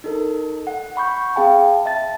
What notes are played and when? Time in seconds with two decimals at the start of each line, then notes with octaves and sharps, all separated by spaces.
0.04 D#4 A4 A#4
0.67 F#5
0.96 F#5 B5 C#6 G6
1.35 C4 G#4 F5 G5 A5 B5
1.86 E5 A5 A6